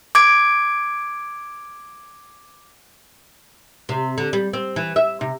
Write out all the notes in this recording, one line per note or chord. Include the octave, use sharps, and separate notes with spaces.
D6 G#6 D7
C3
D3
G3
C4
E3
E5
C3